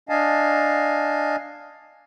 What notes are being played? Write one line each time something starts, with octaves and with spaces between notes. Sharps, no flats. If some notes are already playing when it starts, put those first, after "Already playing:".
D4 D#5 F5 G#5 A5